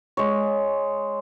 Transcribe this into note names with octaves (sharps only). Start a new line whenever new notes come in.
G#3 C#5